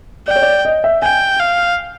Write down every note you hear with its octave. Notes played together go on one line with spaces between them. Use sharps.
D5 G5
C#5
D5
D#5
E5
G5 G#5
F5